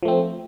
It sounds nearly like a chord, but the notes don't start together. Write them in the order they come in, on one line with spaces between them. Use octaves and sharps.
F3 A3 C4